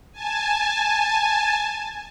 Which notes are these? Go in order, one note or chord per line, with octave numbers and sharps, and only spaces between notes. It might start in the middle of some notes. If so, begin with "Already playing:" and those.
G#5 A5